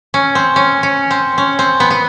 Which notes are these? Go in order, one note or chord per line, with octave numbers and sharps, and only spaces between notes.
C#4
C4
C#4
C#4
C4
C#4
C4
B3
B3